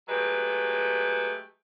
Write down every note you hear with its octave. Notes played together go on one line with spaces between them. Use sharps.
F#3 G#3 A3 G4 B4